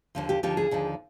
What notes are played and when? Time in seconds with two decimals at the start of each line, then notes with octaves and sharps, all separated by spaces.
0.15 D#2 D3 F3
0.29 G4
0.43 D#2 D3 F3 G4
0.57 G#4
0.71 D#2 D3 F3